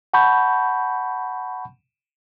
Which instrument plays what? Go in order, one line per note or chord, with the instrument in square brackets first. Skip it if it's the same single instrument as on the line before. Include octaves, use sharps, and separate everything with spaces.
[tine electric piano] F#5 A5 B5 C#6 G6